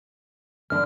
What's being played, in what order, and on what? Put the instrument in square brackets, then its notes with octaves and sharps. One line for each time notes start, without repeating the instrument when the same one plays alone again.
[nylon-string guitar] E2 D3 [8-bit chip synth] F6